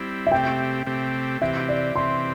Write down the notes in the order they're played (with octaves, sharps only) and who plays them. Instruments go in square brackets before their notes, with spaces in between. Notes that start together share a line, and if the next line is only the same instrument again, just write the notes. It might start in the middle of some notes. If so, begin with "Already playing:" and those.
Already playing: [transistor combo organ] G3 C4 E4
[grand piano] E5
[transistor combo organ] C3 A3 C4 G4 [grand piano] G5
[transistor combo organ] C3 A3 C4 G4
[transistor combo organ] C3 E3 C4 G4 [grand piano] E5
[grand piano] D5
[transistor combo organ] C3 E3 C4 G4 [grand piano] C6